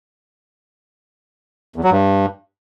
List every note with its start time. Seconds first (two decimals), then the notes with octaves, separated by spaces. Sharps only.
1.76 E2
1.84 F#3
1.91 G2